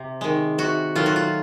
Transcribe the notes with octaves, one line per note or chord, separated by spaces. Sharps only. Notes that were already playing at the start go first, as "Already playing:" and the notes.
Already playing: C3
D#3 G#3
C3 F#4
D#3 F#3 A3 F4
F#4
F4